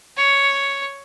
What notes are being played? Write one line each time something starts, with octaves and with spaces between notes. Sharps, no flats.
C#5